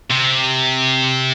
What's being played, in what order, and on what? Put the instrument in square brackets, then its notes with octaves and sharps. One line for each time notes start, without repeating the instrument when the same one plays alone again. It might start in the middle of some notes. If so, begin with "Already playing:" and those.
[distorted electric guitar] C3